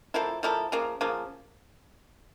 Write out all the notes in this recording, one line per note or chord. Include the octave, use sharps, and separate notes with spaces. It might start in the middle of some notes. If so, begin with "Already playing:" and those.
F3 A#3 E4 A4
F3 A#3 E4 A4
C#3 F3 A#3
C#3 F3 A#3